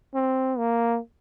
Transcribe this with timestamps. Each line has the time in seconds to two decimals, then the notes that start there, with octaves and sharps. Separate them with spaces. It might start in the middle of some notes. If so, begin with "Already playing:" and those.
0.14 C4
0.58 A#3